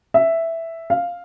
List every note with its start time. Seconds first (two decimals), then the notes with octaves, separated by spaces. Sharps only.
0.14 E5
0.90 F5